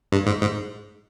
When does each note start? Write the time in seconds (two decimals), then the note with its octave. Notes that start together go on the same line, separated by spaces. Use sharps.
0.12 G2
0.26 G#2
0.41 G#2